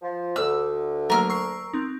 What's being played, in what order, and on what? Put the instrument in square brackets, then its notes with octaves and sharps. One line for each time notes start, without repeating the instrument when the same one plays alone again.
[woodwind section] F3
[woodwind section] D2 [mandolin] E6
[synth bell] F#3 A3 A#3 [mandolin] A#4 F6
[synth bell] C#6 E6 C7
C4 D#4